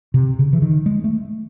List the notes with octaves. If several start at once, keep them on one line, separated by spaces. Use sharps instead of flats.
C3
C#3
E3
D#3
G#3
A3